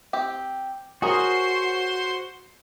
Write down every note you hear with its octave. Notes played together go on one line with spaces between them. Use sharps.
C4 G4
C#4 F#4 G#4 A#4 C5 C6